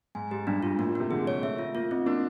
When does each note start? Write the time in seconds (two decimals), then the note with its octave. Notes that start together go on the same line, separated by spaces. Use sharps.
0.15 G#2 G#5
0.31 G#2 G4
0.47 G2 D4
0.63 G#2 F4
0.78 A2 A#3
0.89 A#2
0.95 C3 A#3
1.11 D3 G#4
1.26 G#3 C#5
1.43 A3 E5
1.58 F4
1.75 A#3 F4
1.91 C4 D#4
2.06 A#3 D4